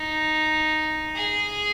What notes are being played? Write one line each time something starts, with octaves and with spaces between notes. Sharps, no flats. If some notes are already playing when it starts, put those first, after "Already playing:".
Already playing: D#4
G#4